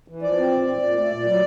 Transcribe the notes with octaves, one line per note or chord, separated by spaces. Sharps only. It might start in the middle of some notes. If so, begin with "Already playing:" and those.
E3
F3 D5
C4
A#2
A#2
A#2
A3
A#2
F#3